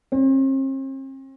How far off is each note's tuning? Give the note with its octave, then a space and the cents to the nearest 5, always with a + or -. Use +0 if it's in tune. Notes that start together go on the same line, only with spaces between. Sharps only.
C4 +45